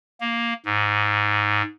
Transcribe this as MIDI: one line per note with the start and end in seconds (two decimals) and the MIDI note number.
0.21 0.53 58
0.66 1.62 44